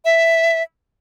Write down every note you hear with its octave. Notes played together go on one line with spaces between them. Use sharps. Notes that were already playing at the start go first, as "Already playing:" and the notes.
E5